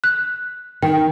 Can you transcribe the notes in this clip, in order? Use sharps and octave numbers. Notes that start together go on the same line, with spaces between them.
F#6
D#3 G5